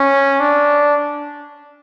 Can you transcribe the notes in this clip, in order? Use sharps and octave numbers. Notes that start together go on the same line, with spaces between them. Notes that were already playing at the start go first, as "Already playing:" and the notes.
Already playing: C#4
D4